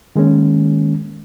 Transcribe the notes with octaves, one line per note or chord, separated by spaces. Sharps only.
D#3 G#3 A#3 C#4